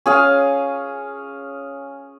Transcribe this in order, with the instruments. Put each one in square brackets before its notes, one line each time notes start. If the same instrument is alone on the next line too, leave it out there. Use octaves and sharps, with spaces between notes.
[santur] C#4 G#4 F5 G#5